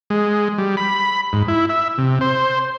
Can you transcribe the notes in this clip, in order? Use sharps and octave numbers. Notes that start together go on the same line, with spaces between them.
G#3
G3
B5
G#2
E4
E5
C3
C5